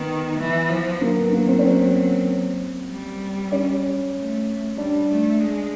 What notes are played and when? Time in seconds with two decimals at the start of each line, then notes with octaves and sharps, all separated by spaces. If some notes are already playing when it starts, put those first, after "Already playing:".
Already playing: D#3 B3
0.38 E3
0.69 F3
1.01 F#3 A#3
1.17 B3
1.32 A#3
1.48 C4
1.59 C#4
1.63 C4
2.89 G3
3.52 C#4
4.15 A3
4.77 G3 D4
5.09 A3
5.40 G#3